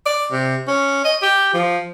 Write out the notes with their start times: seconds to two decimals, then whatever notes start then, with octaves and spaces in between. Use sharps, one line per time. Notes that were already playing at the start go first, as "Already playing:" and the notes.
0.06 D5
0.32 C3
0.67 C#4
1.05 D#5
1.22 G4
1.54 F3